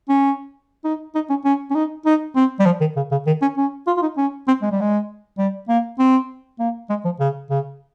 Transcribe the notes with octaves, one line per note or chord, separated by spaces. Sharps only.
C#4
D#4
D#4
C#4
C#4
C#4
D#4
D#4
C4
G3
F3
D#3
C#3
C#3
D#3
C#4
C#4
F4
F4
D#4
C#4
C4
G#3
G3
G#3
G3
A#3
C4
A#3
G#3
F3
C#3
C#3